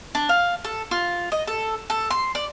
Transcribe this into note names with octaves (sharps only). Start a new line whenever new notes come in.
D4
F5
A4
F4
D#5
A4
A4
C6
D5